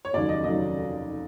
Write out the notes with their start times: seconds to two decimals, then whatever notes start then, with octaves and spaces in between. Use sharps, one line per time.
0.05 C#5
0.13 F1 D#2 C#3 F#3 D5
0.29 D#5
0.44 F1 D#2 C#3 F#3 D#5